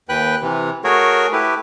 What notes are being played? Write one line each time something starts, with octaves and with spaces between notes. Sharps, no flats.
D#2 B4 G5 F#6
C3 E3
A3 F#4 G#4 A#4 C#5
A3 E4 G4 B4